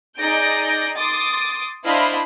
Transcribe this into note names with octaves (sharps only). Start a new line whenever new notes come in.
D#4 G#4 D5 G6 A#6 D7
C6 D6 D#6 A6
D4 E4 C5 D#5 F5 B5